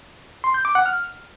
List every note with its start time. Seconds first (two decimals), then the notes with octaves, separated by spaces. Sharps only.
0.44 C6
0.54 G6
0.65 D6
0.75 F#5
0.86 F6